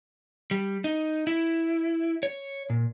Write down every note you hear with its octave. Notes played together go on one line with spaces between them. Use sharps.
G3
D#4
E4
C#5
A#2